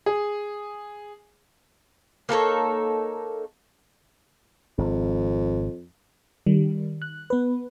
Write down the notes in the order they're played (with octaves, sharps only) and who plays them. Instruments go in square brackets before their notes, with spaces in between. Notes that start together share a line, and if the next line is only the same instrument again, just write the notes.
[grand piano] G#4
[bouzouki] A#3 D#4 A4 C#5
[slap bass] G#1 [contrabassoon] F2
[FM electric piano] D#3 G3
F#6
B3 B4